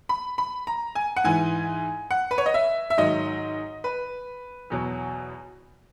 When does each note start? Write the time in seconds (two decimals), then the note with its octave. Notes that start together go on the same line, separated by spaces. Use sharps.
0.09 B5
0.38 B5
0.67 A#5
0.95 G#5
1.16 F#5
1.24 G#2 E3 G#5
2.11 F#5
2.31 B4
2.38 C#5
2.46 D#5
2.54 E5
2.90 E5
2.98 G#2 D#3 F#3 D#5
3.84 B4
4.70 E2 B2 F#3